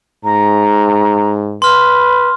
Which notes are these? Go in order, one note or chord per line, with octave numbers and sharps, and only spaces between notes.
G#2 A#5
B4 C6 F6